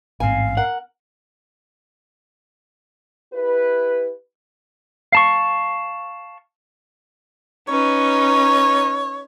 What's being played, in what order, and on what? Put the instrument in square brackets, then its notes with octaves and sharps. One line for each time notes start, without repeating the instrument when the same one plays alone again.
[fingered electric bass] A1 G#2 [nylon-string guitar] C4 G#5 [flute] F5
[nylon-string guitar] A#4 [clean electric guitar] F#5
[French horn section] E4 G4 B4
[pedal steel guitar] F5 A5 C#6
[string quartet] C#4 D#4 B4 [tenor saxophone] C#5